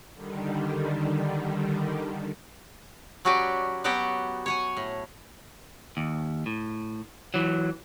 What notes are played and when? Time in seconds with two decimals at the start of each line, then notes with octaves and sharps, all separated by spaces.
0.14 D3 D#3 G3
3.25 F#3 C#4 F#4 G4 B4 D5
3.84 F#3 B3 F#4 G4 F#5
4.46 C#5 F#5 G#5
4.77 A2
5.97 D#2
6.46 A2
7.34 E3 F#3